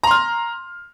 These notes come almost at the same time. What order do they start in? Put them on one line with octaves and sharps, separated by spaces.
A#5 C6 F6